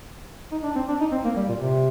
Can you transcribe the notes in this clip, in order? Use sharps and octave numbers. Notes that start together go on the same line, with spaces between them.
D#4
D4
C4
D4
D#4
C4
A#3
G3
A#2
C3